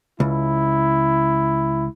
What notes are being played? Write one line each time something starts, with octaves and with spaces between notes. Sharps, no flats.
C#2 E4